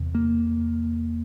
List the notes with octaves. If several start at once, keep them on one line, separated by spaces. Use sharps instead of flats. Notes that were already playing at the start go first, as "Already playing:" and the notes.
Already playing: E2 C3
A#3